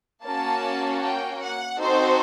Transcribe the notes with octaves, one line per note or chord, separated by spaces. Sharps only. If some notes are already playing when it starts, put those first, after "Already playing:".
A#3 C#4 F#4 A5
G5
F#5
C4 D#4 F#4 A4 C5